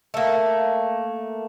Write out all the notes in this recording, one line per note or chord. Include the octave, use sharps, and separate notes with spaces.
A3 A#3